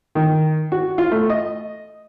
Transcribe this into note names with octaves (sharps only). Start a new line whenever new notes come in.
D#3
F#4
F4
A3
D#5